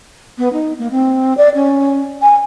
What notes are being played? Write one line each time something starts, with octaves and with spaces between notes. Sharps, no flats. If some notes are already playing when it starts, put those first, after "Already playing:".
B3
D#4
A#3
C4
D5
C#4
G#5